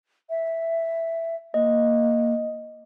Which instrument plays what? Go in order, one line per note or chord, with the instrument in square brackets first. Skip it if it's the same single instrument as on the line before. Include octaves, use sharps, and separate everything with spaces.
[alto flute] E5
[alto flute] A#3 [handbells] D#5